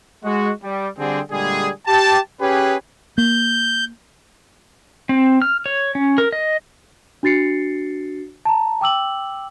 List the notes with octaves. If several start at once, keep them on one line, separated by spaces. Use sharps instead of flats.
G#3 F#4
G3
D3 G3 C4 G#4
A#2 D3 G3 G#3 G#4
G4 A5
C#4 G4 G#4 B4
A#3 G6
C4
F6
C#5
C#4
A#4
D#5
D4 F#4 A6 C7 C#7
A5 A#5
G5 D6 E6 F#7